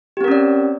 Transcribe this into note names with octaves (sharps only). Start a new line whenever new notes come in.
C4 C#4 G4 A#4 D5